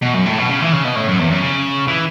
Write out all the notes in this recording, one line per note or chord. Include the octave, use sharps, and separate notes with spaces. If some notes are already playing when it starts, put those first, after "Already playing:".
B2
F#2
A2
B2
C#3
E3
C#3
B2
A2
F#2
E2
F#2
C#3
E3